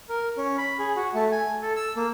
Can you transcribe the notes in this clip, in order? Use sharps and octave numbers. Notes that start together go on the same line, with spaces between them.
A#4
C#4
B5
G#4
F#4
A3
G#5
A4
E6
A#3